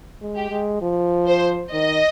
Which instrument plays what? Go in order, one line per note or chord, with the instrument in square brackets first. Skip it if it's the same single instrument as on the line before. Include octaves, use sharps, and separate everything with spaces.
[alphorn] G#3
[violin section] G4
[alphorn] G#3
F3
[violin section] C5
[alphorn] D#3 [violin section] D#5